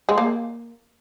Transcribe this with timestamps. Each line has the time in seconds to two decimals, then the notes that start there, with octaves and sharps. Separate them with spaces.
0.09 G#3
0.18 A#3